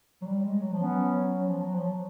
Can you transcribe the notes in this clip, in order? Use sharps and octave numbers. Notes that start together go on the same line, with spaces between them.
F#3
G3
G#3
F#3
F3
F#3 B3 C#4
F3
F#3
F3
F#3